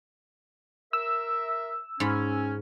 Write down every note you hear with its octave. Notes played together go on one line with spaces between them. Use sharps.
A#4 E5 E6
G#2 C#4 B5